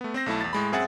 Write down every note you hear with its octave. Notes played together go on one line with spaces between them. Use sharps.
A3 B3
C4 C5 A#6
B1 A3 E4 A5
E2 A6
A2 G#3 B5
F#2 C4 G#4 E5 F#5 A6